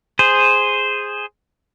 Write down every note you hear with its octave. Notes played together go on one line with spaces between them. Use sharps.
G#4 C5